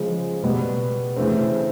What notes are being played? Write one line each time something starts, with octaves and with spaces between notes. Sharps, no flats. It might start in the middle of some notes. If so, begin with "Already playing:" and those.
Already playing: C#3 F3 G#3
B2 G3 B3
C#3 E3 A3 C4